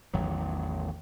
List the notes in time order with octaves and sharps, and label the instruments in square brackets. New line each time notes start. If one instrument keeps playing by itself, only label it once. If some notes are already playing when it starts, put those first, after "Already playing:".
[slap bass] A1 E2 D#3 F#3